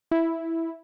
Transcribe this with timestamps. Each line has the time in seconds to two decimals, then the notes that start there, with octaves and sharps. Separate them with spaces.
0.11 E4